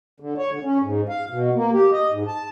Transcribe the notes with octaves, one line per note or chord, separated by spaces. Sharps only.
D3
C#5
D3
C#4
G#2
F5
B2
A#3
G4
D#5
G#2
A5